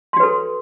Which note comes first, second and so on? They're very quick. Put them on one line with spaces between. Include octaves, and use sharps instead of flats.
C6 F#4 B4 A4